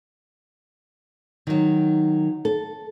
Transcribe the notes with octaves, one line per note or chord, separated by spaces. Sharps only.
D#3 F#3
A4